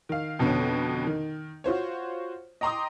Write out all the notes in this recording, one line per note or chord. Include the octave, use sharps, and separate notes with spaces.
D#3 F5
F2 B2 D3 B3 C#4
D#3
F4 F#4 C5 C#5
D#5 G5 A#5 C6 D6 D#6